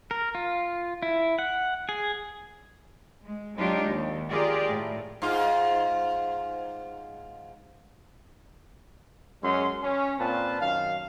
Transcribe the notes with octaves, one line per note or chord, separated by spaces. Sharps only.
A#4
F4
E4
F#5
G#4
G#3
F#3 G#3 D4 D#4 F4 G4
D#2
F4 G4 G#4 A#4 D5
A2
G#2 F4
F#2 G#3 C#4 C6
C#4
A#2 C4 F4 B4 A5
F#2 D#3 F5